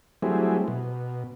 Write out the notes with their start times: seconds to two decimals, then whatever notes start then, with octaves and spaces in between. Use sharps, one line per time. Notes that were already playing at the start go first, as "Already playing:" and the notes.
0.22 F#3 G3 A3 C4 E4 G#4
0.68 B2